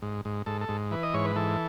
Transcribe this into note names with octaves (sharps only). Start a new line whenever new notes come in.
G#2
G#2
G#2 A4
A4
G#2
E3 B4
D#5
G#2 C#5
B4
E3 A4